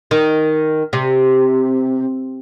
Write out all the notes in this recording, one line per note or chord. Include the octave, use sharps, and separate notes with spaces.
D#3
C3